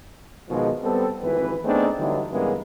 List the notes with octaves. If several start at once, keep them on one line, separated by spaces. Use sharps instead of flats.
B2 D#3 F3 G#3
G3 B3 C4 A4
G#1 F2 E3 B4
A3 B3 C4 D4 D#4 G#4
D3 E3 F#3 G3 D#4 E4
G2 C#3 E3 G#3 A#3 B3